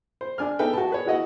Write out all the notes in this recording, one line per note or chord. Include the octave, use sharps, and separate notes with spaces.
C5
D4 G#5 F6
B3 D#4 A4 B4 E5 G5
F#4 A5
G#4 B4 C#5
E4 F#4 D#5 F#5